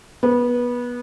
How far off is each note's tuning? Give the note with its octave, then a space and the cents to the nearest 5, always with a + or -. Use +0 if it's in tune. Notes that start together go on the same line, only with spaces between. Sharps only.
B3 -20